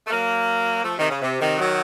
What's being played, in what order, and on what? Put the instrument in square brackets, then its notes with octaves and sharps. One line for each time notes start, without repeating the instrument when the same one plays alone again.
[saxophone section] A3
F#3 A#3
F3 A3
C3 D#3
C#3
C3
C3 D#3
D#3 F#3